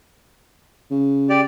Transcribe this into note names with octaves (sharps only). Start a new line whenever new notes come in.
C#3
G4 D5